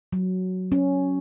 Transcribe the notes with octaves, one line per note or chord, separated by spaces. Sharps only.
F#3
C#4